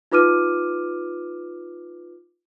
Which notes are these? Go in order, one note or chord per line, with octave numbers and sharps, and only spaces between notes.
D#4 F4 B4 D6 F6 D#7